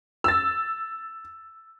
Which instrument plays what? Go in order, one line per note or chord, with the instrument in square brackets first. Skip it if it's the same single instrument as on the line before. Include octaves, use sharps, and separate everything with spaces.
[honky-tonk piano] E6 A6